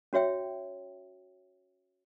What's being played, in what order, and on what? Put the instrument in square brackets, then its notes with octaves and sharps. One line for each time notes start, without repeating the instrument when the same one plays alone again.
[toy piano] C#4 F#4 C#5 E5 G5